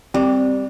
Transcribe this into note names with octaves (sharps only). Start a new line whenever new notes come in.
G3 C4